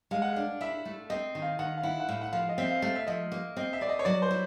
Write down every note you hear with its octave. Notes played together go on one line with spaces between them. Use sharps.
G#3 F5
F#5
D4 F5
E4 E5
A3
C4 D#5
D#3
F5
D#3 F#5
F5
E4 F#5
F#5
A2 F5
F#5
F3 F5
D#5
C4 E5
F5
A3 F5
E5
F3 D#5
A#3
C4 D#5
E5
C4 D5
D#5
C#5
F#3 D5
C5
E4